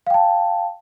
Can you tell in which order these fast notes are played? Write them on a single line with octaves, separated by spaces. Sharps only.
F5 G5 A5